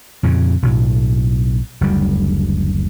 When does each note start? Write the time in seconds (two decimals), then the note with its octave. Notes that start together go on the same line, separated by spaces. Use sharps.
0.23 F2 A#2 C#3
0.62 B1 A2
1.81 F#1 D2 G3